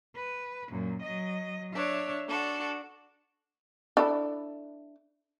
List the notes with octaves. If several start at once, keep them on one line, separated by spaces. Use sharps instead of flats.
B4
F#2 A#2
F#3 D#5
D4 C#5 E5
D4 F#4 A4
D4 E4 A4